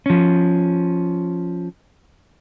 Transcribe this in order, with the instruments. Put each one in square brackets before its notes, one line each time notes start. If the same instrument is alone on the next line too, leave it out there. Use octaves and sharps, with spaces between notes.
[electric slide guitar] F3 C#4